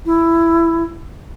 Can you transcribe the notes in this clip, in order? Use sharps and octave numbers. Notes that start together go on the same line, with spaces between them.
E4